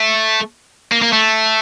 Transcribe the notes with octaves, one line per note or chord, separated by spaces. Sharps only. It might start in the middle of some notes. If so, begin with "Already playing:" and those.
Already playing: A3
A#3
A#3
A3